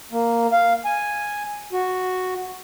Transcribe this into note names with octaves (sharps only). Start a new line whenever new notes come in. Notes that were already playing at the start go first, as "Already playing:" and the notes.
A#3
F5
G#5
F#4